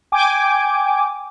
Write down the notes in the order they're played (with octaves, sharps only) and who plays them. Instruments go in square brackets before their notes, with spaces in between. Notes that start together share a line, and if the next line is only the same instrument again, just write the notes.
[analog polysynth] G5 G#5 D6